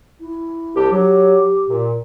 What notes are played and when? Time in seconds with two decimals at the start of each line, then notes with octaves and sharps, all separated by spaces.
0.20 E4
0.75 C2 D4 G4
0.92 F#3 G4
1.69 A#2